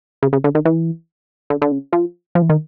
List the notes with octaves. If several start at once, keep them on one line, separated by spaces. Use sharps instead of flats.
C#3
C#3
D3
D#3
E3
D3
D3
C#3
F3
F3
E3
D#3